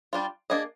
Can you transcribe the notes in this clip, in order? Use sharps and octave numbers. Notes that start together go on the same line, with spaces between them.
G3 D4 F4
A#3 D4 G#4 D#5